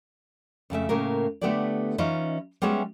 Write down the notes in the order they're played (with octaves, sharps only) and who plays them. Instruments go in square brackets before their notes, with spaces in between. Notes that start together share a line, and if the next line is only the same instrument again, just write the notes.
[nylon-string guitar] F2 C#3 A3 E5
A2 C#3 A#3 A#4
D3 A3 B3 G4 A4 D5
E3 C#4 D#4 F4 D#5
G3 G#3 B3 C#4 G#4 E5